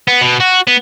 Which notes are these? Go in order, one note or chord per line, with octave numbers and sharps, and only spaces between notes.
B3
B2
F#4
B3